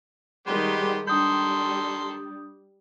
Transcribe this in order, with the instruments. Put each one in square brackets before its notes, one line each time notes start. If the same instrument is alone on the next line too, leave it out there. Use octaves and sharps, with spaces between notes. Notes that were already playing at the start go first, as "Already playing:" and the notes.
[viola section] D#3 G3 G#3 [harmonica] B3 G4 C5
[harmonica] D#3 A4 C6 [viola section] G3 [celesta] D4 D#6 G6